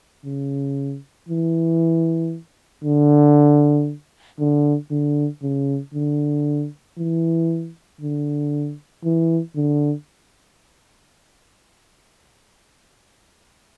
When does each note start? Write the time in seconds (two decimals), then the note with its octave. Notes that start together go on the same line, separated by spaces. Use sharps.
0.25 C#3
1.29 E3
2.84 D3
4.39 D3
4.91 D3
5.43 C#3
5.94 D3
6.98 E3
8.01 D3
9.04 E3
9.56 D3